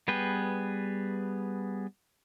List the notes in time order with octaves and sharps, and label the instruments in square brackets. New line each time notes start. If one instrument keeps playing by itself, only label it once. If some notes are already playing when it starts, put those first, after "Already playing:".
[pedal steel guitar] G3 B3 G#4 B4 G5